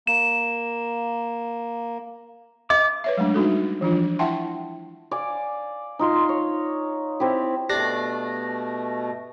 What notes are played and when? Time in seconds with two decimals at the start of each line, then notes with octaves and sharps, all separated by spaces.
0.07 A#3 E7
2.70 D#5 D6
3.04 B4 C#5 E5
3.17 F#3 G#3 A3 D4
3.34 G3 D#4 F#4 A4
3.81 E3 F3 D4 F4
4.19 E4 E5 F#5 G5 A5 C6
5.11 D5 F5 G#5
5.99 D#4 F4 C6
6.29 C#5
7.20 C4 E4 G4
7.70 B2 A3 D4 G4 D5 A#6